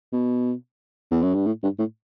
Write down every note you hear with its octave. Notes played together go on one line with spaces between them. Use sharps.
B2
E2
F#2
G2
A2
G2
A2